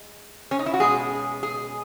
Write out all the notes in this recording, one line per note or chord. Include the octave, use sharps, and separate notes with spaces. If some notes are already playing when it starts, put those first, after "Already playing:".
Already playing: G#3
C#4
D#4
E4
F#4
B2 G#3 C#4 G#4
G#4